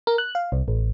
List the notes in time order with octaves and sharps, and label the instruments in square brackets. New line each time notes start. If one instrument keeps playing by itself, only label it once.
[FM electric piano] A#4
F#6
F5
C2
A1